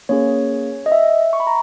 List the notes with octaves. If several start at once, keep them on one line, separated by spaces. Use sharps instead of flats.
A#3 C#4 G#4 C#5
D#5
E5
C#6
B5
A#5